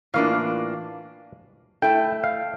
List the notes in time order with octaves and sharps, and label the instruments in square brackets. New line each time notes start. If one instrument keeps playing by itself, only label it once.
[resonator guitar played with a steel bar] A2 E3 A#3 D4 F4 [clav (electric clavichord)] F5
[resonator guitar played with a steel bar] A3 E4 A4 [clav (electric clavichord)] G5
[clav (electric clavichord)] F5